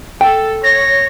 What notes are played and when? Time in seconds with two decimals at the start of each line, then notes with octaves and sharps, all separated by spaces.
0.21 A4 G5
0.63 C#5 A#6